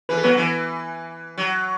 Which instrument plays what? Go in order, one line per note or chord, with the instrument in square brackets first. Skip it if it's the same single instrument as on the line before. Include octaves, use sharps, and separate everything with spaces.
[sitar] E3 [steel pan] B4
[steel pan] A4
[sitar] F#3 [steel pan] B3 B4
[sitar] E3
F#3